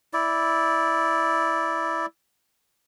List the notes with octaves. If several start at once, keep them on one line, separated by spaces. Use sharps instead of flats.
E4 D5